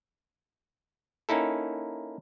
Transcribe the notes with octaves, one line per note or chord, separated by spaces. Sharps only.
A#3 C#4 D#4 E4 A4